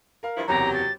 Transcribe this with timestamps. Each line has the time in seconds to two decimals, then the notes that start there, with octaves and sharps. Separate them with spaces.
0.23 A#4 F5
0.36 G2 F3 E4
0.48 F#1 E2 C3 F#3 G4 A#5
0.74 A6